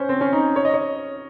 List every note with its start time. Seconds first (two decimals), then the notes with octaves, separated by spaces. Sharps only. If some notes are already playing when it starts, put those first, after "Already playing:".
Already playing: C#4 C5
0.09 C4
0.21 C#4
0.33 D#4
0.56 C#5
0.65 D#5
0.74 C#5